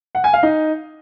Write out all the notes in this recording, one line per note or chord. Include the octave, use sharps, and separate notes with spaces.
F#5
G#5
F5
D#4